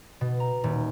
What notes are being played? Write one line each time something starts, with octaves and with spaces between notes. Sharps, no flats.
B2
A#5
D#1